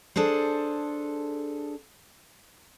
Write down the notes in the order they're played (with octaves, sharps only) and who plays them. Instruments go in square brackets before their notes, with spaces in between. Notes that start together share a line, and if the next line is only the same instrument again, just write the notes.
[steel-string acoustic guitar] D4 G#4 A4 C5